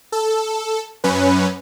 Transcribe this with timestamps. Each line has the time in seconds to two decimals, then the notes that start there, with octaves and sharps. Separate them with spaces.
0.12 A4
1.04 F#2 C#4 B4